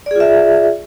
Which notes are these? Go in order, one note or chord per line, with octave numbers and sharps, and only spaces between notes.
F4 G#4 D5 E5